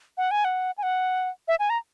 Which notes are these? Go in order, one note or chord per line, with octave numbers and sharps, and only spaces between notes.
F#5
G#5
F#5
G#5
F#5
E5
G#5
A#5